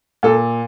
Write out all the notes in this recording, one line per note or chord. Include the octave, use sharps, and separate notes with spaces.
A#2 A4